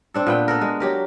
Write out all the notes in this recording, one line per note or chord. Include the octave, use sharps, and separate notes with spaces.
C4 D4 A4
A#2 B3 G5
B3 A4 A#4
G#3
F#3 G4 A#4